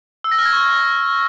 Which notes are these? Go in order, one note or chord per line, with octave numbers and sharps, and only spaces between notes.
E6
A#6
F6
G#6
C#6